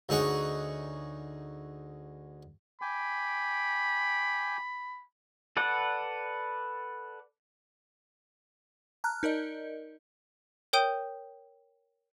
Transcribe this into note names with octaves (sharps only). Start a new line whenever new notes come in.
D2 D#4 G#4 C#5 F#5
G5 G#5 B5 D6
A4 B4 D5 F#5
A5 A#5 F6 F#6
D#4 A#4 D5 D#5
A#4 C#5 G5 D#6 G6 D#7